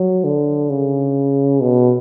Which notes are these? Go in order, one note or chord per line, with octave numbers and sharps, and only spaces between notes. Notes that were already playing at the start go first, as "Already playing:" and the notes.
Already playing: F#3
D3
C#3
B2